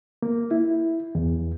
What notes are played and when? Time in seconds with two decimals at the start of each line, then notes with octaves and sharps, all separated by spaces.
0.22 A#3
0.51 E4
1.15 E2